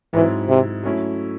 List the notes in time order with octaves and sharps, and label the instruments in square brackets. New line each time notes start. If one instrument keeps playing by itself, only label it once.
[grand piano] G#2 F#3 C4 E4 [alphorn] E3
[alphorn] C3
[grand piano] F#3 A3 C#4 E4